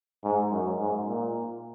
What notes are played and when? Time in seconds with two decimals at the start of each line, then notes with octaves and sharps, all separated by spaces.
0.24 G#2
0.51 F#2
0.80 G#2
1.08 A#2